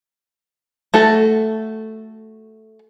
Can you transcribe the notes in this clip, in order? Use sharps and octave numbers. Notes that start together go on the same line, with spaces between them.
A3 F#4 A4